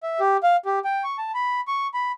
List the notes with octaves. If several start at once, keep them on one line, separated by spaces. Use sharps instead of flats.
E5
G4
F5
G4
G5
C#6
A5
B5
C#6
B5